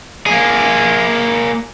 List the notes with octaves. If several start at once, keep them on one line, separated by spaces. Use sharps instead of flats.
A#3 G#4